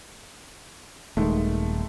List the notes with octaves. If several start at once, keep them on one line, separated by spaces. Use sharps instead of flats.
D#1 D#3 G#3 A3